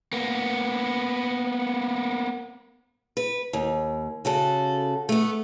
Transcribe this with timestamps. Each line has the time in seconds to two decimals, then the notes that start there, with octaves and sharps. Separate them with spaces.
0.13 A#3 B3
3.17 B4
3.53 D#2
4.25 C#3 F#4 A4
5.09 A3 B3